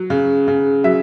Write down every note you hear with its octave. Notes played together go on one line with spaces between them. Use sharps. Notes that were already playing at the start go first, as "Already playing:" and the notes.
Already playing: F#3
C#3
C#3
F#3 E5